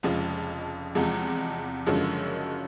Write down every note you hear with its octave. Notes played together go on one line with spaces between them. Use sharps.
F1 F2 C#3 F3 G#3
E2 C3 F3 G#3
F#1 F#2 D3 F3 G#3